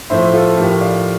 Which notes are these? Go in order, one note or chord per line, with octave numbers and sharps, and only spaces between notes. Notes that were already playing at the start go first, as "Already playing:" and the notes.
A2 F3 A3 C5 E5
F4 A4
A2 F3 A3 G4 A#4
D5 F5